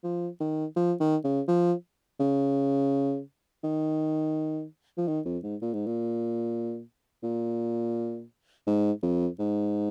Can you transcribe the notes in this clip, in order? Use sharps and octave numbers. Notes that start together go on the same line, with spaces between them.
F3
D#3
F3
D#3
C#3
F3
C#3
D#3
F3
D#3
F2
G#2
A#2
G#2
A#2
A#2
G#2
F2
G#2